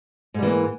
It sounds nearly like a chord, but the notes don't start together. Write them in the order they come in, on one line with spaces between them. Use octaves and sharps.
G#2 G3 E3 A#3